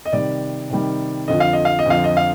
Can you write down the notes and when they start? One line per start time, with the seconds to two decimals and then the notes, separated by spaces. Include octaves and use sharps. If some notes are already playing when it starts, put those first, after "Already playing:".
0.06 D#5
0.12 C3 D#3 G3 D5
0.70 C3 D#3 G3
1.28 F2 D3 F3 D#5
1.40 F5
1.53 D#5
1.65 F5
1.79 D#5
1.86 F2 D3 F3 F5
2.04 D#5
2.17 F5